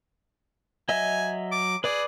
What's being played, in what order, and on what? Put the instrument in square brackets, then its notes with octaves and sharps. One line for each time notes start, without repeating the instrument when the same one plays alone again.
[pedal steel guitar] F#3 D#5 E5 [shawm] G#5
[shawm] D6
[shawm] G#4 [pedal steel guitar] B4 D5 D6